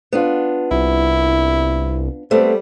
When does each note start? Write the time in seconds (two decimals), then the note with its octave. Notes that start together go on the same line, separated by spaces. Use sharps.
0.13 B3 D4 F4
0.71 C2 E4
2.31 G3 A3 B3 C4